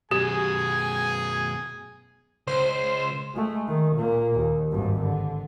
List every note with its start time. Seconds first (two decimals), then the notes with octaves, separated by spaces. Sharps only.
0.11 F#2 B2 G4 G#4 G#5
2.47 C#2 C5
3.34 G#3 A3
3.68 D#3
3.97 A#2 A#3
4.36 D#2
4.71 G#1 G2
5.02 D3